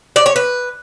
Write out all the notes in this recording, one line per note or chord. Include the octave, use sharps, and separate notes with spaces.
D5
C#5
B4